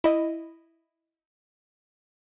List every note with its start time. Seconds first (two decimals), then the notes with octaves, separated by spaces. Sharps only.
0.04 E4 D#5